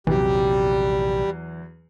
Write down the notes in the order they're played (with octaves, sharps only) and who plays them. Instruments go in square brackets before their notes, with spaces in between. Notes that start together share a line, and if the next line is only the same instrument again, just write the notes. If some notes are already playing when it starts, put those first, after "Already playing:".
[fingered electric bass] A#1 C3 [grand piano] E2 F#3 [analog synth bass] E3 [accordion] G3